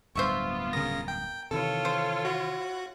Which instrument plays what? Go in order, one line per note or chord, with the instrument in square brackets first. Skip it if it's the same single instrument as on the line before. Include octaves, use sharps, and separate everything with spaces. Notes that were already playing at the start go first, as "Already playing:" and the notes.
[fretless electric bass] D1 G2 [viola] B3 F4 [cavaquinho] C5 E5 C#6
[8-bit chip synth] C#3 A#6 [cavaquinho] A#4 D#6
[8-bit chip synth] G5
[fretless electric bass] C3 D#3 E3 [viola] F4 C#5 [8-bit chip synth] A4
[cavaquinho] C5
[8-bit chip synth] F#4